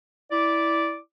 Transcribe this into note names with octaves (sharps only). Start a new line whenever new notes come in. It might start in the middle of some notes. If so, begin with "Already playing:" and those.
E4 D5 D6